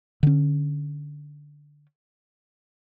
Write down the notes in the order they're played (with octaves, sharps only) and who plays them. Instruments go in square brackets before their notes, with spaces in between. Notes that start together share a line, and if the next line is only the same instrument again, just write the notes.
[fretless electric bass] D3 C#4